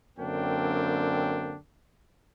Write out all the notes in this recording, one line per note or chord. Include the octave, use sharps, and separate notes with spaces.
F#2 D3 A#3 C4 D4 G5